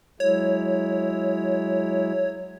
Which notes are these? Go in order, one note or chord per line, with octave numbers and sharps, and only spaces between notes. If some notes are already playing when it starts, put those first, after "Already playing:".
F#3 G#3 E4 C#5